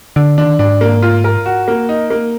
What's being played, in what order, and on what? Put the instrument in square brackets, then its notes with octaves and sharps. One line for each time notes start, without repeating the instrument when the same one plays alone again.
[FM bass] D3 [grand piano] D4
[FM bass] D#3 [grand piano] D4
[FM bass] G#2 [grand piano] D4
[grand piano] A#3
F4
A#4
F#4
A#3
D#4
A#3